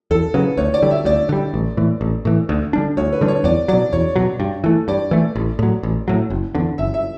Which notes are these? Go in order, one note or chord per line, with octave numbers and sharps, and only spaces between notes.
E2 A4
C#3 F#3 B4
D2 C#5
D5
D3 G3
E5
D2 D5
D3 G3
A1
A2 E3
A1
A2 E3
D2
D3 G3 D4
D2 C#5
B4
D3 G3 D4
C#5
E2 D5
B2 F#3 D5
E2 C#5
B2 F#3
G2
E3 A3
G2 D5
E3 A3
A1
A2 F#3
A1
A2 F#3
F#1
E2 D3
F#1 E5
E5